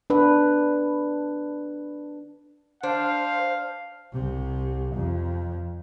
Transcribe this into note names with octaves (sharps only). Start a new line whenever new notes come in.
D4 B4
D4 C5 F5
C2 C3
F2